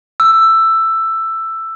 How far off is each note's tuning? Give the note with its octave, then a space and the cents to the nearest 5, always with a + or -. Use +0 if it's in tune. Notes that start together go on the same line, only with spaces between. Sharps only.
E6 +10